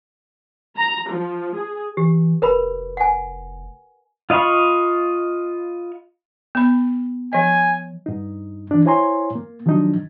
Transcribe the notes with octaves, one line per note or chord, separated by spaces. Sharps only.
A#5
F3
G#4
E3 G4
F1 A#4 B4 B5
F#5 G#5
F4 D#5 F5 B5 C#6
B3 B5
F3 D#5 G#5
G2 D#4
E3 D4
E4 C5 C#5 G#5 A#5 C6
A#3
D#3 F3 F#3 D4 D#4